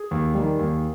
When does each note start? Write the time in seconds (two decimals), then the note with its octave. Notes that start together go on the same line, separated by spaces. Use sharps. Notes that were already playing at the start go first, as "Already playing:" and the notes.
Already playing: G#4
0.11 D#2
0.35 D#3 G3
0.59 D#2